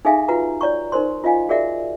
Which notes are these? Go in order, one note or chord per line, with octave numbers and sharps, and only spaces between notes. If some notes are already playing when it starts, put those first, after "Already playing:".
D#4 G#4 A4 E5 F5 G#5
F4 F#4 B4 F#5 A#5
C#5 D5 A#5 C#6
D#4 A#4 C5 C6
F4 D#5 F5 G#5
F#4 G#4 A#4 D5 E5 F#5